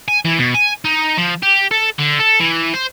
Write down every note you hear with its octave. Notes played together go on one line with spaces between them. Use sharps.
G#5
E3
B2
G#5
D#4
F3
G4
A4
D3
A4
E3
C5